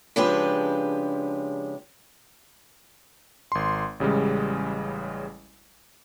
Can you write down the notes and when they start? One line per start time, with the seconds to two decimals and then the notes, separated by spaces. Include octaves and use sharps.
0.16 C#3 F3 G#3 D4 G4 B4
3.52 G#1 C6
4.00 A1 C#3 G3 G#3